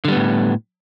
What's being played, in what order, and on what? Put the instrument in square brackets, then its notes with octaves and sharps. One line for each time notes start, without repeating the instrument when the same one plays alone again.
[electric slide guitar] D3
G3
B3
A2